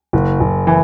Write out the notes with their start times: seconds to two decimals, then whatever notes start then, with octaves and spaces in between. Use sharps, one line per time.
0.13 F#1
0.40 F#1
0.67 E3